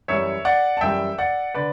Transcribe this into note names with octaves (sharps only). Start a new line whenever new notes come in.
F#2 E3 G3 C#5 E5
D5 F#5
A5
F#2 E3 G3 E5 G5
D5 F#5
D3 B4 D5